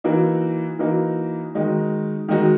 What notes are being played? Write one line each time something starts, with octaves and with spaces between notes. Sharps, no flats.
E3 A#3 D#4 F#4
E3 A#3 D#4 F#4
D#3 G#3 D#4 F#4
D#3 G#3 D#4 F#4